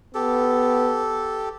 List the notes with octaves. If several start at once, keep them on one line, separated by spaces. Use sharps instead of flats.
B3 G4 A4